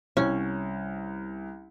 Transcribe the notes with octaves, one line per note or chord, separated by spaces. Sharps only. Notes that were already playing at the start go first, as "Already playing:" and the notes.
C2 C#4